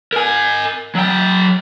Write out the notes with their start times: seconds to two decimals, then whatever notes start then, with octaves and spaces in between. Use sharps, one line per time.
0.13 A#4 G#5
0.95 F#3 G5